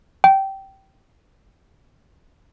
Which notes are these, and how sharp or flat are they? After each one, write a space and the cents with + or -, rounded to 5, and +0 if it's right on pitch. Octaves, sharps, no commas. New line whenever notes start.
G5 -15